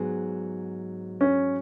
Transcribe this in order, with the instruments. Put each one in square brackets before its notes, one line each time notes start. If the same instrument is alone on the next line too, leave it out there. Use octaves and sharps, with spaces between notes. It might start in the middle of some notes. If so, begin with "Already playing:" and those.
Already playing: [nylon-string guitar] G#2 F#3 B3 G#4
[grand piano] C#4